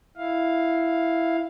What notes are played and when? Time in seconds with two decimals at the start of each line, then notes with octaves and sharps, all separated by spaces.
0.17 E4 F5